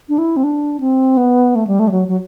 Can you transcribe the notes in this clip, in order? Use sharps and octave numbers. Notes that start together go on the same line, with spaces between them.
D4
E4
C4
D4
C4
B3
A3
G3
A3
G3
F#3
F#3